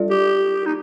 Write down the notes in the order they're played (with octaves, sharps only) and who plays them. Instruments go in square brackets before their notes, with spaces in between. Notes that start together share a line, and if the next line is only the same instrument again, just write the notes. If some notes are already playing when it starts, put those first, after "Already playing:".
Already playing: [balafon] G3 D4 F4 A4 D5
[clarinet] G4
D#4